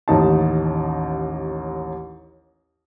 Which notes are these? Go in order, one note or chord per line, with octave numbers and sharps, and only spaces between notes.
A1 D#2 D#4 A5